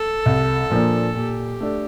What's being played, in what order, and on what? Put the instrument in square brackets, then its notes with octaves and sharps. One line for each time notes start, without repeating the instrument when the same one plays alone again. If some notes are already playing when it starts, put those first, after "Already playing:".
Already playing: [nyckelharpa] A4
[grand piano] C2
A#2 F3 A#3 D4
[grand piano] A#2 [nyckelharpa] G4
[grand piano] A3 D4 A4